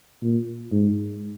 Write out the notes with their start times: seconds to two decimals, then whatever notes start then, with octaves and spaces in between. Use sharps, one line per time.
0.22 A#2
0.72 G#2